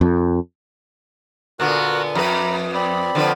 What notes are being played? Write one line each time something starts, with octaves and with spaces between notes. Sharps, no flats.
F2
A#2 D3 B3 F#4 A#4 F#6
F2 B4 A#5 B5
C4 D5 B5
D3 F3 B4